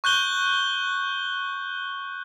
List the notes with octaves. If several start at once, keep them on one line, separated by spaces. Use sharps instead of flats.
C#6 F#6 G6 G7